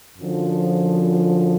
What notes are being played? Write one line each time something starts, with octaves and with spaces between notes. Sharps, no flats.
F#2 D3 F3